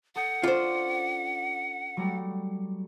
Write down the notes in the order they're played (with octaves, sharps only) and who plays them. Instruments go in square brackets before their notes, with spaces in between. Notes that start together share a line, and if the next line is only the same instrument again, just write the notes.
[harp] A4 D#6 G6 [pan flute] F#5
[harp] C#4 D4 A4 [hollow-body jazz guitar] F4 C5
[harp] F#3 G3 A3